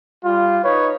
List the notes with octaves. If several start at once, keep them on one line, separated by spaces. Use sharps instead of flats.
G3 F4
D#4 B4 C#5